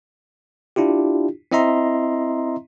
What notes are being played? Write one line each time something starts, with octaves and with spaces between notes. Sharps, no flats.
D4 E4 F4 G4
C4 E4 D#5 E5 A#5 C6